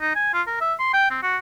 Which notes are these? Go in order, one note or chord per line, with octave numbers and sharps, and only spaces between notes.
D#4
G#5
F4
A#4
E5
C6
G5
C4
F#4